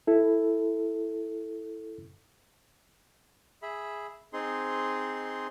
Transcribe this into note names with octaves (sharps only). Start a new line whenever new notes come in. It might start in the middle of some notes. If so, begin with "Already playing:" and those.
E4 A4
G#4 E5 B5
C4 D#4 G#4 C6